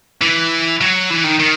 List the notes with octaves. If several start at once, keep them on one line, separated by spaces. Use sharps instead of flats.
E3
F#3
E3
D#3
D#3